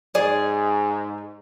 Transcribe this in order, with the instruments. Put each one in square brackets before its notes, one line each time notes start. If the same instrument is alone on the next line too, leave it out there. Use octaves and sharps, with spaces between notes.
[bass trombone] G#2 [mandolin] G#4 [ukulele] D5